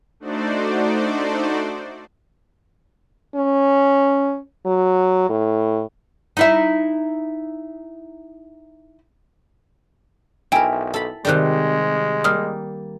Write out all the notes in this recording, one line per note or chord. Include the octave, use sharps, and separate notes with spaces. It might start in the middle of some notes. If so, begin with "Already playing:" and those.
A3 D4 D#4 F#4 C5 D5
C#4
F#3
A2
D#4 E4 E5
B1 E4 A#4 G5 G#5 D7
A4 B5
C3 D#3 G3 G#3 D5 F#6
G3 A#3 D#6 F6